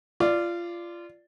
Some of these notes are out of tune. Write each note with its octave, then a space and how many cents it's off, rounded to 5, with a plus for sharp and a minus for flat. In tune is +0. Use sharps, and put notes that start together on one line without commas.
F4 -20 D5 +0